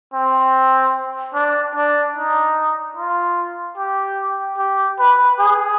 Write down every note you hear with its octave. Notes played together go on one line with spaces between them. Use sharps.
C4
D4
D4
D#4
F4
G4
G4
B4
G#4